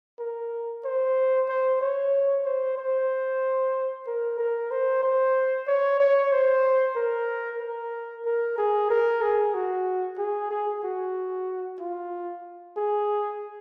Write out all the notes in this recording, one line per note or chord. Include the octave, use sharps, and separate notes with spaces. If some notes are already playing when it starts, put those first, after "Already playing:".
A#4
C5
C5
C#5
C5
C5
A#4
A#4
C5
C5
C#5
C#5
C5
A#4
A#4
A#4
G#4
A#4
G#4
F#4
G#4
G#4
F#4
F4
G#4